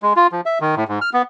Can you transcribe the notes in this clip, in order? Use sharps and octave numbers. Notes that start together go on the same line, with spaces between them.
G#3
F4
F3
E5
D#3
A2
G#2
F6
B3